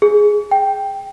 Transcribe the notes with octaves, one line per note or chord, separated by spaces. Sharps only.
G#4
G5